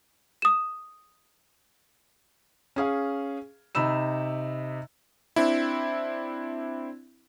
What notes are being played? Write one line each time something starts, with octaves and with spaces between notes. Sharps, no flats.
D#6 E7
C#4 G#4 F5
C3 D#4 B5 E6 E7
C4 D4 E4